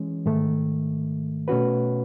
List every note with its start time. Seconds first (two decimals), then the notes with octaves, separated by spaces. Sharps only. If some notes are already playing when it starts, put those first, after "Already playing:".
Already playing: E3 G#3 C#4
0.26 G#2 D#3 A3
1.48 B2 A3 C#4 F#4 B4